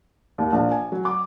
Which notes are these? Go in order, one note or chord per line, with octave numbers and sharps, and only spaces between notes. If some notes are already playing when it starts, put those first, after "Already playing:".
D#2
A#1
G#5
F#3
D6